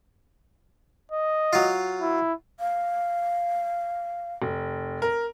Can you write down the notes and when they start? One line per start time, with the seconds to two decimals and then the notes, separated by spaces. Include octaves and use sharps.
1.12 D#5
1.53 F#3 F4
2.01 E4
2.60 F5
4.42 F1
5.02 A#4